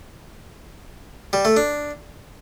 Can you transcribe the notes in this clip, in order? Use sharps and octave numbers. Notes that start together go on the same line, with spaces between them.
G3
A3
D4